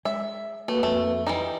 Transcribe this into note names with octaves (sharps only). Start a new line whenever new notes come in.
G#3 E5
A3 A#3 F#4 B4
F2 A3 C4
E3 G3 D#4 A#5